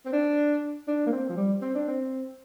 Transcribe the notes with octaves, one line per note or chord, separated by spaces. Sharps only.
C4
D4
D4
A#3
C4
F3
G3
C4
D4
C4